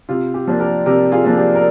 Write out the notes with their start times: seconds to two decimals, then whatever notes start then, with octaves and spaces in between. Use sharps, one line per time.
0.09 C3 F4
0.34 G4
0.47 F3 A#3 D4
0.60 G4 A#4
0.86 C3 G4 A#4
1.12 F4 G#4
1.25 F3 A#3 D4
1.38 G4
1.55 A#4